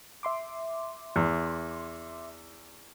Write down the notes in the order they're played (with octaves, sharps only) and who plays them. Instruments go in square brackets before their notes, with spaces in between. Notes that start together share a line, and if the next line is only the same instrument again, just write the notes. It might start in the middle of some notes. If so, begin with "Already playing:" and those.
[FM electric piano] E5 C6 D6
[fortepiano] E2